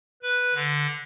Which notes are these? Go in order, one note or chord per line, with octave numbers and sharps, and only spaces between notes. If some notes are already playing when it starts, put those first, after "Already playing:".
B4
D3